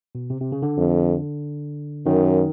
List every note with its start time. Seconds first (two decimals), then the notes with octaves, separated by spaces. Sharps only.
0.15 B2
0.30 C3
0.41 C3
0.52 C#3
0.62 D3
0.78 F2
2.06 F#2 D#3